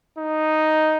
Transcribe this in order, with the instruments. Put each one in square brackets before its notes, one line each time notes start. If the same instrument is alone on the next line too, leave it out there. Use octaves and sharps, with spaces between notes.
[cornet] D#4